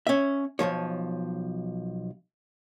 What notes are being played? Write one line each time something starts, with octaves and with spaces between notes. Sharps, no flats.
C#4 E5
B1 G#2 F3 C#5